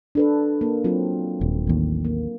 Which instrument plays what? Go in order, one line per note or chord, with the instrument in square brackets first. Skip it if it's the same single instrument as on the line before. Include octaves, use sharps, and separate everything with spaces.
[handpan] D4 A4 B4
A#3
F#3 C4 F4
[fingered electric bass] D#1
A1 D#2
[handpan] A#3